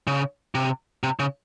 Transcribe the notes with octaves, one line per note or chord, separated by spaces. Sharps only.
C#3
C3
C3
C#3